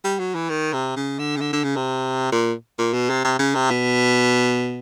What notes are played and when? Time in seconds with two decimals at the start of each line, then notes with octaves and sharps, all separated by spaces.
0.04 G3
0.19 F#3
0.35 E3
0.49 D#3
0.73 C3
0.96 C#3
1.19 D3
1.37 C#3
1.41 D3
1.53 D3
1.64 C#3
1.76 C3
2.32 A#2
2.78 A#2
2.93 B2
3.09 C3
3.24 C3
3.39 C#3
3.55 C3
3.70 B2